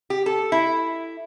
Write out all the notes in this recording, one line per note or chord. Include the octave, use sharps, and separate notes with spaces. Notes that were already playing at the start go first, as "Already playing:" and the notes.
G4
A4
E4